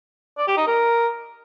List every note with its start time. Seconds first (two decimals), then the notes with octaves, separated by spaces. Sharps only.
0.38 D5
0.48 G4
0.57 D#4
0.67 A#4